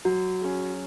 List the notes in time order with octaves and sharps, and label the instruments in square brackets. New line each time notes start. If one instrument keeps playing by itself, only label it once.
[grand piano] F#3 [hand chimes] F#4
[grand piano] C#4 G#4